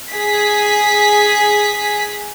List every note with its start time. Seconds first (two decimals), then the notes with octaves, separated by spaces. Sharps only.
0.12 G#4 B6